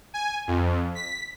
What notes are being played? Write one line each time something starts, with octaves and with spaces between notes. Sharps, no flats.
G#5
F2
B6